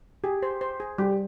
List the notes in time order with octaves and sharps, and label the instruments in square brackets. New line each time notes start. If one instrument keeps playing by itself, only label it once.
[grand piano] G4 [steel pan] G#4
[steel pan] C5
C5
G#4
[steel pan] G3 [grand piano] G4